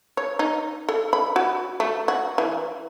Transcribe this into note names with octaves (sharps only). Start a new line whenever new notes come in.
C#5
D#4
A4
B5
F#4
A3
F#4
E3